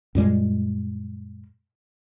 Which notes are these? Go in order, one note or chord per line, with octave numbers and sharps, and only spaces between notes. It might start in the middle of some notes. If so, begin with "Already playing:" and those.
F#2 A#2 G3 G#3